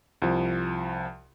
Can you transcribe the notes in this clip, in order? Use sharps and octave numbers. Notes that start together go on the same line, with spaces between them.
C2 F3